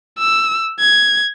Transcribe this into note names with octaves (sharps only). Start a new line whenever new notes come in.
E6
G#6